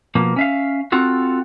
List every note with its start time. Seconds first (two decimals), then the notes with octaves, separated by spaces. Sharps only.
0.15 B2 F3 A#3
0.36 C#4 E5 F5
0.92 C4 F4 F#4 A4